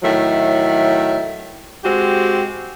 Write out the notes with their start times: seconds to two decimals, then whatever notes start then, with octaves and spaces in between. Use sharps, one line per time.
0.02 A2 D#3 F#3 E5
1.84 G#3 C4 F#4 G4